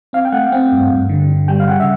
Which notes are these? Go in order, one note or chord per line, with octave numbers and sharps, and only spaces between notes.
C4 F5
G5
A3 F#5
C4 G5
G2
G2
D3
D3
G3 G5
F5
C#3 F#5
E5